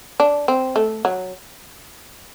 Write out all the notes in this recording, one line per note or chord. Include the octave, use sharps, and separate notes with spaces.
D4
C4
A3
F#3